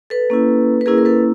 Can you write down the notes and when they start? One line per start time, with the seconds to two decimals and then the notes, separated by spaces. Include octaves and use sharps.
0.10 A4 B4
0.30 A#3 C#4 E4
0.81 B4
0.86 A#3 C#4 E4 G#4 A#4
0.98 A#4
1.05 A4 B4